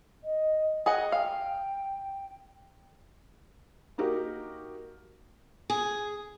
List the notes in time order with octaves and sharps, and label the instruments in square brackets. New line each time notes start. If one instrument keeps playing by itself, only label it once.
[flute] D#5
[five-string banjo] G#4 D#5 F#5 [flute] G5
[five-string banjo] F5 [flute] G5
[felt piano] A#3 D#4 F#4 G4 A#4
[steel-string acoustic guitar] G#4